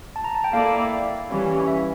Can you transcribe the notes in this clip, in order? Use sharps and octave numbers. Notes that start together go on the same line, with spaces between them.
A5
A#5
A5
G5
A#3 E4 A4 D5 F5
E3 G3 C#4
E5